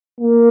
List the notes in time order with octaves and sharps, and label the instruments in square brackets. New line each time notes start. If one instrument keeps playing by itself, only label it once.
[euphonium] A#3